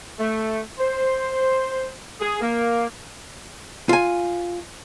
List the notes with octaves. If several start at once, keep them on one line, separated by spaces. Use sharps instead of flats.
A3
C5
G#4
A#3
F4 G#5